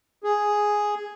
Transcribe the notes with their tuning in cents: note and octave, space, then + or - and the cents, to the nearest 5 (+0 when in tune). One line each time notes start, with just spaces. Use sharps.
G#4 +0